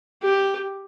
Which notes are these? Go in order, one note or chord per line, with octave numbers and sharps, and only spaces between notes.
G4